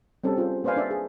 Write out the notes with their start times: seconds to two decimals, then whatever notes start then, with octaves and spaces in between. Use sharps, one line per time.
0.24 G3 C4 C#4 A4
0.37 C#4 F4 G#4 C5
0.64 A#3 B4 C5 D5 F5 G#5
0.76 D4 D5 E5
0.91 G#4